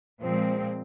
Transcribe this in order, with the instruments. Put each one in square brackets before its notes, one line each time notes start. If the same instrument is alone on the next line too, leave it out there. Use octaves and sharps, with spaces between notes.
[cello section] A#2 F3 G#3 C4